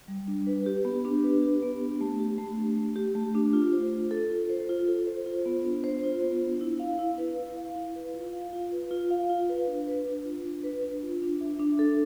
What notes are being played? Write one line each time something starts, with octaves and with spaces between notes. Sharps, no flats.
G3
D4
B4
G4
B3
D4
B4
G4
B3
D4
A3
G4
A3
D4
A3
G4
A3
D4
F4
C5
F4
A4
F4
C5
F4
A4
C5
F4
B3
D4
C5
F4
B3
D4
E4
F5
E4
B4
E4
F5
E4
B4
F4
F5
F4
B4
F4
F5
F4
B4
D4
B4
D4
F4
D4
B4
D4
F4
D4
E5
D4
A4